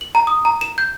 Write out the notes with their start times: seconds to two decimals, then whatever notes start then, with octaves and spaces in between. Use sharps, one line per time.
0.01 F#7
0.15 A#5
0.27 D#6
0.45 A#5
0.61 E7
0.78 G6